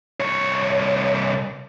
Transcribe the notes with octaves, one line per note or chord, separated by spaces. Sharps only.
C2 C#5